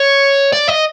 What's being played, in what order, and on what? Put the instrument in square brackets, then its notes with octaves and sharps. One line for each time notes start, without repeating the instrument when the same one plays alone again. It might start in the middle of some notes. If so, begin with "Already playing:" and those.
Already playing: [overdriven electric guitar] C#5
D5
D#5